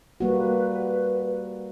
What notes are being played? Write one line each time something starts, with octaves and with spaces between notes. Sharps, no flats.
G3 A#3 F#4 B4